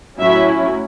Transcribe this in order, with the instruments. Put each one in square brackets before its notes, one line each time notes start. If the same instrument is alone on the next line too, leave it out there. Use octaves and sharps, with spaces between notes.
[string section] A2 F#3 C#4 E4 E5